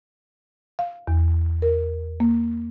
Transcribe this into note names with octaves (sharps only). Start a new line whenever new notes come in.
F5
E2
A#4
A#3